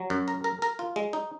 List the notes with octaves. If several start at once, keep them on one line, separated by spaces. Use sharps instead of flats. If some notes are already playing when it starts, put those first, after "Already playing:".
Already playing: F#3
F#2
A#4
A#4
A#4
F4
G#3
D#4